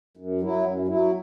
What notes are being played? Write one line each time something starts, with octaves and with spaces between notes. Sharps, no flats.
F#2
F#3 E4
F#2
F#3 E4